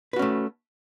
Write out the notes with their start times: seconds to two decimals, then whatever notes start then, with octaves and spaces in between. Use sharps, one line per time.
0.13 B4
0.16 F#4
0.19 C#4
0.22 A3